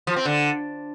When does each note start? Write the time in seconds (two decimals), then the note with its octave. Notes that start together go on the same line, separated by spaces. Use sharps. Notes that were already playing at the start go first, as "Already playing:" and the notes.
0.07 F3
0.16 C4
0.25 D3